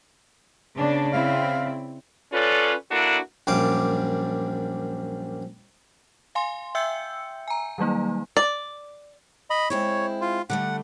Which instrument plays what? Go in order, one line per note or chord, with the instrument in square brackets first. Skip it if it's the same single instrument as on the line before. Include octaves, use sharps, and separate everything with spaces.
[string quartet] C#3 D5 [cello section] B3 D4
[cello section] C4 E4 [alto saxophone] F5
[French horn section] C#4 F4 A4 B4 C#5 D5
A#3 D4 E4 F#4 A4
[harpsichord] A#1 F#2 G3 F5 D6
[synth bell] F5 G#5 C6
E5 G5 E6 G6 C#7
G#5 A#5
D#3 F#3 G3 A#3 D#4
[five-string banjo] D5
[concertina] D#5 B5
[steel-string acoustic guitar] G#3 C4 E4 [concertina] C#5
[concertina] F4
[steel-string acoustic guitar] D3 G3 A3 [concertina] F#5